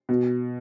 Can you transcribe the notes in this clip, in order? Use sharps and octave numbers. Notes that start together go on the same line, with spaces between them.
B2